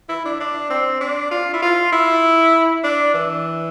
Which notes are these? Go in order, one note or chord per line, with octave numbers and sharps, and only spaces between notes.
E4
D4
D4
C4
D4
F4
E4
F4
E4
D4
E3